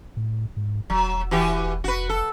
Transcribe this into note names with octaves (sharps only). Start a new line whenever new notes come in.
A2
G#2
E1 F#3
E3 F#4 G4
F1 F#4 B4
A4